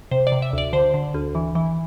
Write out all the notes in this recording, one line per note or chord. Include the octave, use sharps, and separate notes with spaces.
C3 C5
D5
C3
E5
D2
D5
D3 C5
D3
D2
E3
E3